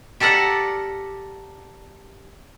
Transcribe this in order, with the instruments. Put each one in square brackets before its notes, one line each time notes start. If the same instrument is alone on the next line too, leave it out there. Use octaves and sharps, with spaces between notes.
[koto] G4 A4 A#4 D5 F#5